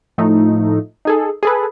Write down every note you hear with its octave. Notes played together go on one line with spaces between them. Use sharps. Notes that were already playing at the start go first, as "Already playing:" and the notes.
A2 F3 A3 D#4
D#4 G#4 A4
G#4 A4 B4